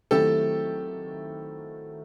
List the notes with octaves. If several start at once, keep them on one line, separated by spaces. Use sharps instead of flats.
D#3 F#3 A3 C4 E4 G4 A4